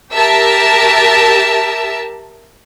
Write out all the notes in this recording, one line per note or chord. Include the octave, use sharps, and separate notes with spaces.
G4 A#4 E5 A5 E6